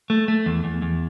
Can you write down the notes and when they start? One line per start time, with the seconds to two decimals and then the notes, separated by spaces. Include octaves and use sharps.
0.10 A3
0.28 A3
0.46 E2
0.64 E2
0.82 E2